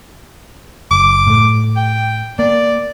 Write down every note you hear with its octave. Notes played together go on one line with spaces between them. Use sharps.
F#1 D6
A2 A3
G5
A#3 D5